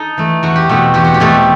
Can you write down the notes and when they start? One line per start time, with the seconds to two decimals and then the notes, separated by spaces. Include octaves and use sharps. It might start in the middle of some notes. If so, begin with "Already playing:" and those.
Already playing: D#4 A4
0.17 E3 A3
0.43 E2 F#4
0.56 G4
0.69 B2 A3 C4 F#4
0.94 E2 G4
1.04 F#4
1.14 G4
1.20 B2 A3 C4